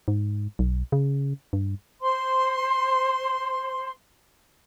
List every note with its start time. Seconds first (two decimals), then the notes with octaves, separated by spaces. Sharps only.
0.08 G#2
0.59 B1
0.92 C#3
1.53 G2
2.01 C5 C6